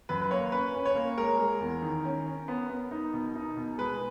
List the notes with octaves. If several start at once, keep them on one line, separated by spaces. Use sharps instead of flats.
F#2 B4
B4
A#3 C#5
C#4 B4
C#4
C#5
A#3
G#3 A#4
G#3
E2
D#3
C#4
C#4
B3
B3
D#4
B2
D#4
B2
G#3 B4